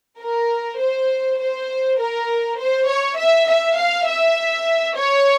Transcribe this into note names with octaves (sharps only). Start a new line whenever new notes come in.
A#4
C5
C5
A#4
C5
C#5
E5
E5
F5
E5
C#5